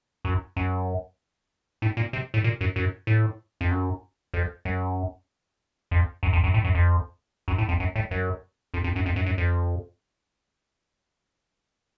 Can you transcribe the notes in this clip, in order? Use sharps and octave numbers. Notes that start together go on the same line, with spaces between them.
F#2
F#2
A2
A#2
C3
A2
A#2
F#2
F#2
A2
F2
F#2
F2
F#2
F2
F#2
F2
F#2
A2
F#2
F2
F#2
A2
F2
F#2
A2
F#2
F2
F2
F#2
F2
F#2
F#2
F2